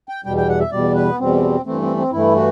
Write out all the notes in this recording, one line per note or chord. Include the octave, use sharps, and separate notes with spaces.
G5
E2 B2 G3 G5
G5
F#5
E5
E2 B2 G3 D5
B4
B3
E2 B2 G3 C4
G2 E3 A3 C4
C4
C4
G2 E3 A3 E4
F#4